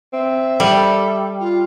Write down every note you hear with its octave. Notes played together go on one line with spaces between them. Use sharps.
C4 E5
G3 A4
F4